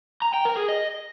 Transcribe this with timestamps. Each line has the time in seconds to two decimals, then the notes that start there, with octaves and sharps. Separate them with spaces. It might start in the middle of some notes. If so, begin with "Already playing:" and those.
0.22 A#5
0.34 G5
0.45 A#4
0.57 G#4
0.69 D#5